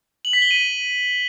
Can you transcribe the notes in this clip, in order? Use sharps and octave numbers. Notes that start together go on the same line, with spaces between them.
F#7
B6
G7
D#7